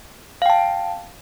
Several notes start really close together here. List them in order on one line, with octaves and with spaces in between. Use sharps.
F5 G5 A5